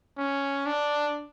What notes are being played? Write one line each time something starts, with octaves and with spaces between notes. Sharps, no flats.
C#4
D4